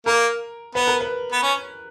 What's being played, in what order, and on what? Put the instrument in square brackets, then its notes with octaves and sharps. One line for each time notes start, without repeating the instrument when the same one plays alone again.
[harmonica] A#3 [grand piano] A#4
[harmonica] B3 [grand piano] B4
[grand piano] A#4
B4
[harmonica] B3
C#4